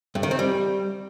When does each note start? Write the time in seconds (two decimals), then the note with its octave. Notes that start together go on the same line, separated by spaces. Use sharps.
0.15 G2
0.23 D#3
0.31 C4
0.39 G3